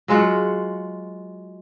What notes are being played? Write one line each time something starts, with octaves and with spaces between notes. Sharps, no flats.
F#3 G#3 F4 F#4